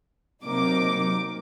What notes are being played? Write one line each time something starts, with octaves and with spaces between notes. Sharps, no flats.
C3 F#3 A#3 D#4 D6